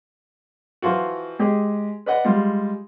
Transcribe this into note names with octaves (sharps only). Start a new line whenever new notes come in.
E3 F3 F4 F#4
G#3 G4 G#4
B4 D5 D#5 F#5
G3 G#3 F4